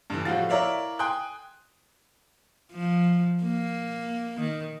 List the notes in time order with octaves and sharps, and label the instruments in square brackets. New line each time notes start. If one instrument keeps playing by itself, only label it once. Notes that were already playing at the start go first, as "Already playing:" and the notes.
[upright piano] G2 D3 E3
A2 F3 G3 F#4 F5 A6
E4 A#4 C#5 D5 E5 F5
G5 G#5 C6 D#6 F#6
[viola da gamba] F3
A#3
D#3